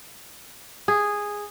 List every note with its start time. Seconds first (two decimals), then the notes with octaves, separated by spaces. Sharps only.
0.88 G#4